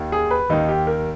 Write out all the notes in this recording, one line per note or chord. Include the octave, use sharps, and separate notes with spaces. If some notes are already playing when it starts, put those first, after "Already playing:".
Already playing: D#2 D#3
G#4
B4
D#2 D#3 D#4
G4
A#4